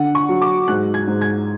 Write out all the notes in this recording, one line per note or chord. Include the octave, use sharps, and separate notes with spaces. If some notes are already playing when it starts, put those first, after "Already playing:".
Already playing: D3 F#5
C#6
F#3
D6
G#2 F#6
G#6
G#2
G#6